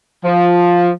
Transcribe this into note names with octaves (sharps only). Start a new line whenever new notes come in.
F3